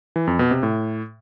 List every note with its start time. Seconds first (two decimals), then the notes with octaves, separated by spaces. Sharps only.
0.16 E3
0.27 F2
0.39 B2
0.51 C3
0.63 A2